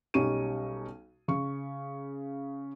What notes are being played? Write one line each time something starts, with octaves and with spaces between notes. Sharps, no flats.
B1 G3 C#4 D#4 C#6 D#7
C#3 C#6